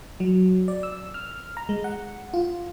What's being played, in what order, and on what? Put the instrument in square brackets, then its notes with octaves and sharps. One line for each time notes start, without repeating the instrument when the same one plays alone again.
[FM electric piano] F#3
D5
E6
F6
A#5
G#3
F#5
F4